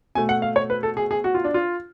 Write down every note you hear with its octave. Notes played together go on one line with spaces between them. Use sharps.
B2 A3 G#5
F#5
F5
C#5
B4
A4
G#4
G#4
F#4
F4
D4
F4